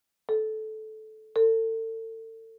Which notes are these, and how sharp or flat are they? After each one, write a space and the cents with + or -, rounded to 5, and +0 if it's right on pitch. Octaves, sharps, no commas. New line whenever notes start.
A4 -15
A4 +35